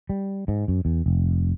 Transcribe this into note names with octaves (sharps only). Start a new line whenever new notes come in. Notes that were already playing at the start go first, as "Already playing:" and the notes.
G3
G#2
F#2
E2
F1